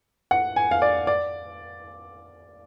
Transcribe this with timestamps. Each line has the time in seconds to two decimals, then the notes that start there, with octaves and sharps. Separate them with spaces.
0.31 F#5
0.56 G#5
0.71 F5
0.82 D5
1.07 D5